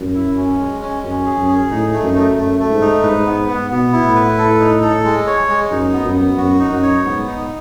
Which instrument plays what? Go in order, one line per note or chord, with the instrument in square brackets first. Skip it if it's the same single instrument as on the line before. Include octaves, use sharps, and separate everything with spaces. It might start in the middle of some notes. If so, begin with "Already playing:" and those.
Already playing: [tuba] F#2
[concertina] E4
C#4
G#3
C#4
[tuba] F#2 [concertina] C#4
[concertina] G#4
[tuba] F#2
[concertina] G#4
[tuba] A2 [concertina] D#4
[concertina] A3
[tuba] F#2
[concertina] A3
[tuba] F#2 [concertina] A3
[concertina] A3
[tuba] G#2
[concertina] D#4
[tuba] G#2 [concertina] B4
[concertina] B3
B3
[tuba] B2 [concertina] B3
[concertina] E4
[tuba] A2
[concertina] B4
A4
D#4
A4
G#3
C#5
G#3
[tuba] F#2 [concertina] D#4
[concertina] B3
[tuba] F#2
[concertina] B3
[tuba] F#2 [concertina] F#4
[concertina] D#4
[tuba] F#2
[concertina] C#5
[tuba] G#2 [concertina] B3
[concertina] D#4